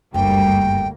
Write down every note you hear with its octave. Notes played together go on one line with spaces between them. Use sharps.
F#1 D2 G2 G3 A#3 G5